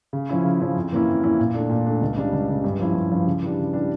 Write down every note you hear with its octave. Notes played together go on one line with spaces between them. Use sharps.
C#3
F3 C#4 E4
C#3
F3 C#4 E4
F2
E3 A#3 C#4 E4
F2
E3 A#3 C#4 E4
A#2
A3 D4
A#2
A3 D4
C#2
C#3 G3 D4
C#2
C#3 G3 D4
G2
F3 C#4 E4
G2
F3 C#4 E4
C#3
E3 G3 D4
C#3
E3 G3 D4